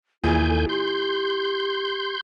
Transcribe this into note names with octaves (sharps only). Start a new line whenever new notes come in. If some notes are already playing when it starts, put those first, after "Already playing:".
D#2 A#2 E3 F4 G#4 G#5 G6
A4
G4 C6 G6